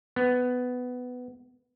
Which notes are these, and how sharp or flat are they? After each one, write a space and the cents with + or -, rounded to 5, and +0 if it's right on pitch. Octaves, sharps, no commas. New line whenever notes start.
B3 +10